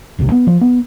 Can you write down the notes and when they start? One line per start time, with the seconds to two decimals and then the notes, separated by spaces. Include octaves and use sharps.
0.19 D#1 C2 C3
0.32 B3
0.47 F3
0.61 B3